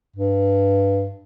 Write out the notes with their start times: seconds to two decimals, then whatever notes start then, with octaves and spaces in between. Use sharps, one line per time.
0.16 G2